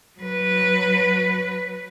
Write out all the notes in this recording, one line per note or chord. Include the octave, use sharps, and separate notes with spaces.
F#3 B4